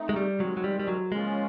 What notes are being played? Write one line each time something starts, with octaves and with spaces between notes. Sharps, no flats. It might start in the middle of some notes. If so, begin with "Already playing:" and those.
Already playing: A3 C4 D#4
G#3
G3
D#3 F#3 G#3 C4
F#3
G3
G3
F#3
C#3 F3 G#3 A#3 C#4 F4